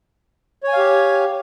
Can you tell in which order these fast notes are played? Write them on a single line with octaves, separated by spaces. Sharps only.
C#5 G#5 F5 G4